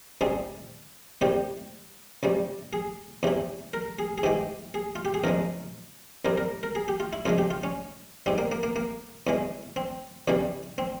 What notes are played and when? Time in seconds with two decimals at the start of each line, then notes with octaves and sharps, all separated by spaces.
0.21 C#2 C3 G3 G#4
1.21 C2 C3 G3 G4
2.23 C#2 C3 G3
2.73 G#4
3.23 E2 C3 E3
3.73 A#4
3.99 G#4
4.18 G#4
4.23 G#2 E3 G#3 G4
4.74 G#4
4.96 F4
5.05 G4
5.14 G#4
5.24 E2 C#3 F3 G#3 A#4
6.25 C2 C3 G3 A#4
6.38 A#4
6.63 A#4
6.75 G#4
6.88 G4
7.00 F4
7.13 E4
7.26 F2 C#3 F3 G#3 F4
7.38 G4
7.50 F4
7.63 C#4
8.26 G#2 G3 C4
8.38 A#3
8.52 A#3
8.63 A#3
8.76 A#3
9.27 E2 E3 G#3
9.76 C4
10.28 E2 C#3 E3 G3
10.78 C4